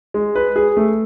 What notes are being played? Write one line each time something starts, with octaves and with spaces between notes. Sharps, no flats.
G#3
B4
G#4
A3